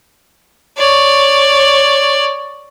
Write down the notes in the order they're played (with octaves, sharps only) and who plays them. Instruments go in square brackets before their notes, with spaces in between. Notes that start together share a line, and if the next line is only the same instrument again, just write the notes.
[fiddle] C#5 D5